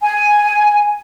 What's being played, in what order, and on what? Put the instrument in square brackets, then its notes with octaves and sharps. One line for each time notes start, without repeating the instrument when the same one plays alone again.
[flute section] G#5